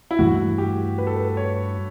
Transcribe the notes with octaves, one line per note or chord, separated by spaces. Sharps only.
E4
G2 E3 A3 F#4
G4
B4
A4
B4
C#5